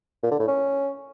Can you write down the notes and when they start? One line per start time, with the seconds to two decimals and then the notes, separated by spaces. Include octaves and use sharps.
0.23 A#2
0.31 D3
0.39 A2
0.48 C#4